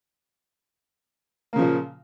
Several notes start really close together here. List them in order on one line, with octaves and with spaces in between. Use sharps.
A#3 C#3 F3 A#2